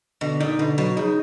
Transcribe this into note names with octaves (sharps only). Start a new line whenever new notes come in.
B2 D3
A#2 D#4
B2 D3
B2 F#3
C#3 D#4